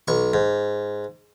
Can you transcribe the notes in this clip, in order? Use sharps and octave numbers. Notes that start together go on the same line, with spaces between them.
B1 C#6
G#2